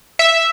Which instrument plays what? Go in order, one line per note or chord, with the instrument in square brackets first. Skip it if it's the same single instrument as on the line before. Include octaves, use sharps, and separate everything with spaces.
[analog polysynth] E5